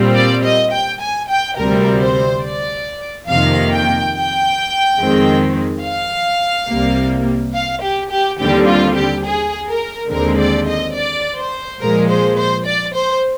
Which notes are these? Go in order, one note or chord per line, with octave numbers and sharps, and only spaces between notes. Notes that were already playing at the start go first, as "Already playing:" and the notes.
Already playing: A#2 G3 C4
D5
D#5
G5
G#5
G5
D2 C3 G3 C4 A#4
C5
D5
F2 C3 D#3 A#3 F5
G5
G5
F2 D#3 G#3 C4
F5
C2 C3 G3 A#3
F5
G4
G4
D#2 D3 G3 C4 G4
F4
G4
G#4
A#4
D#2 D3 G#3 C4 A#4
D5
D#5
D5
C5
A#2 F3 G#3 A#4
C5
C5
D5
C5